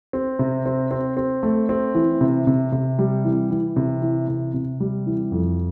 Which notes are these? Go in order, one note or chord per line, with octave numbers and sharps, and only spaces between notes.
C4
C3
C4
C4
C4
A3
C4
E3
C3
C3
C3
G3
E3
E3
C3
E3
C3
C3
G3
E3
F2